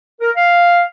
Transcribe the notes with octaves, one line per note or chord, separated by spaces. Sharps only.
A#4
F5